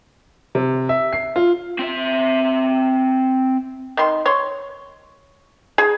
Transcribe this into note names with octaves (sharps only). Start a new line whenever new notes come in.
C3
E5
C7
F4
C4 E5
D#3 C6
C#5 C6
G#4